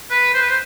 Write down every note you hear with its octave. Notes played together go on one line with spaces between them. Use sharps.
B4
C5
B4
C5